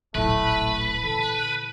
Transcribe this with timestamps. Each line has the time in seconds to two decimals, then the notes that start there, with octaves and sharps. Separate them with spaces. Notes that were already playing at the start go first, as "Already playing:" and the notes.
0.15 D1 A1 A#2 A3 E4 B4
1.04 D3 E3 A4